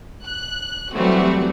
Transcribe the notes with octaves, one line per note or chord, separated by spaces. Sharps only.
F#6
E3 F#3 G3 A3 C4 F#4